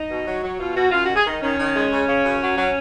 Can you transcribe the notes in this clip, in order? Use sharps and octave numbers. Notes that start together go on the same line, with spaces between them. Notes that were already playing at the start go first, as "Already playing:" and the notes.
Already playing: D#4
B2
F#3
F#3
B2 F4
B2 F#4
F#2 F4
D#3 F#4
G#4
D#3 D#4
D#3 C#4
D#3
G#3
C#3
C#3
F#2
F#3
F#3